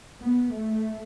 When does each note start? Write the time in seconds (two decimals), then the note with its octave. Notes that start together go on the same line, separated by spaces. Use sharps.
0.22 B3
0.53 A3